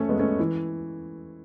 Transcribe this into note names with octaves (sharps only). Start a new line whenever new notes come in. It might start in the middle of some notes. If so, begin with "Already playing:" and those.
Already playing: A3 C#4
G#3 B3
A3 C#4
E3